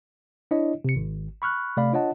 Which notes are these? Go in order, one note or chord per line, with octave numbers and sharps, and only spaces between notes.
D4 E4 C#5 D#5
C3 C#7
G#1
B5 C#6 F6 F#6
C3 A3 D5 F5 B5
D4 F4 C#5 D#5 F#5 A5